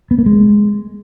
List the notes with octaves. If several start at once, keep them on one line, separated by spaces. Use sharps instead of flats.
B3
A#3
G#3